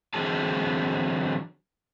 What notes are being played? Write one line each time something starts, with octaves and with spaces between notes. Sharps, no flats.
D3 E3 F#3 C4 G#4 A5